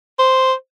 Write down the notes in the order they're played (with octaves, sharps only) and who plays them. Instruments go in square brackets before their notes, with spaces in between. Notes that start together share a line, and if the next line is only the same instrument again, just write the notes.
[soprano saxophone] C5